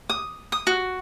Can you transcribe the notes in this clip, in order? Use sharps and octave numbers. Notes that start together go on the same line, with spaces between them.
D#6
D#6
F#4